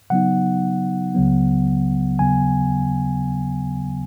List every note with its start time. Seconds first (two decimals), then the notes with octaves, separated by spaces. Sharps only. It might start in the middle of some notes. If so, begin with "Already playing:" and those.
0.10 C#3 F#3 B3 D#4 F#5
1.14 C#2 C#3 F#3 B3
2.19 D#2 C#3 F#3 B3 G#5